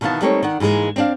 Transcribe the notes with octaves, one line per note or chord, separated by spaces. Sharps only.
B2 D#3 E3 B3 F5 A5
G3 A3 A#3 C4 D#4 C#5
D#3 D5 F#5
G#2 E3 G3 G#3 A#3
C4 D4 F5